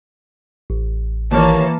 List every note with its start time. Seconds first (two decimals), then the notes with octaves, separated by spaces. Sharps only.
0.70 A1
1.31 D#2 E3 A#3 C#5 A5